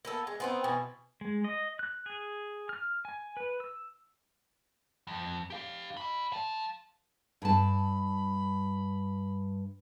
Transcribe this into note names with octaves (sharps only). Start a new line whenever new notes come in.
A#3 B3 A4
G#3
B3 C4 D#4
B2 E3
G#3
D#5
F#6
G#4
F6
G#5
B4
E6
F2
G4 F5
D#5 B5
F5 A5
G2 A5 B5